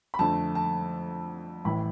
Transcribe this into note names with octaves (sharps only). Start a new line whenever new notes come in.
B5
F2 D3 A3 A5
A5
A1 A2 E3 B5